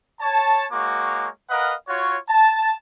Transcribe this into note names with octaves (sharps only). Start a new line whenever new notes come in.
C#5 A5
G#3 A#3 F#4 C#5 D6
A#4 B4 D#5 F5 F#5
F4 F#4 C#5
A5